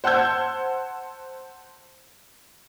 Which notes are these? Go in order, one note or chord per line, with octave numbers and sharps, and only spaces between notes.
C5 F#5 A5 E6 G6 G#6